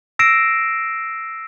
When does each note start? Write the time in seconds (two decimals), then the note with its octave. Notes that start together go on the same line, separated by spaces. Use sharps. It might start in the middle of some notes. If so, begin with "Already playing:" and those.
0.19 E6 A#6 C7 D7 E7